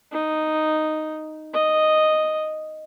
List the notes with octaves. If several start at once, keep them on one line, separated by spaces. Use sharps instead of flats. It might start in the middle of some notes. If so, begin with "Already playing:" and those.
D#4
D#5